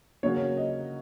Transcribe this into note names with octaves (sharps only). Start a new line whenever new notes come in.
C#3 F#3 A#3 C#4 C#5
D#5